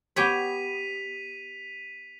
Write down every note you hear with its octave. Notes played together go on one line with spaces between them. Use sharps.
B3 G4 C#5 B6 D#7 F7